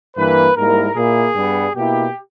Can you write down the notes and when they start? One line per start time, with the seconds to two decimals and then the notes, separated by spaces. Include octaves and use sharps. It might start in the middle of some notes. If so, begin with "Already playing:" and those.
0.17 G2 E3 A#3 B4
0.56 G#2 G3 A#3 E4 A#4
0.96 A#2 A#3 E4 G#4
1.35 G2 G3 B3
1.76 B2 A#3 E4 G4